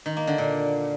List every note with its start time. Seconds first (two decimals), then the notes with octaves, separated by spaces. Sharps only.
0.06 D#3
0.17 A#3
0.27 D3
0.38 A#2